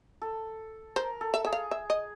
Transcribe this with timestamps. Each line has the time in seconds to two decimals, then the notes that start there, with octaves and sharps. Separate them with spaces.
0.22 A4
0.96 A#4 C5
1.21 A4
1.34 E5
1.45 G#4 E5
1.53 F5
1.71 E5
1.90 D#5